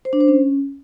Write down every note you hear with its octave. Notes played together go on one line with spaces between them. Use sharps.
C5
D4
C5
C#4